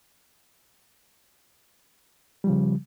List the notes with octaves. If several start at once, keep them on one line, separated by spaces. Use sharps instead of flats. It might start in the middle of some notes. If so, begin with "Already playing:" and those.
C#3 F3 G3